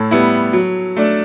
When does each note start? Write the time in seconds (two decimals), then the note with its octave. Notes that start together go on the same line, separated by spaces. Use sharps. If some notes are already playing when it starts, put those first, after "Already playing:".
Already playing: A2 A4 C#5
0.11 G3 B3 E4
0.53 F#3
0.97 A3 D4